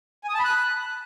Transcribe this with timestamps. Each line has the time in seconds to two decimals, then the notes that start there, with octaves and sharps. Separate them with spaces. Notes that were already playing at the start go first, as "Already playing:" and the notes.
0.24 G#5
0.29 D#6
0.34 A5
0.39 B5
0.44 F#6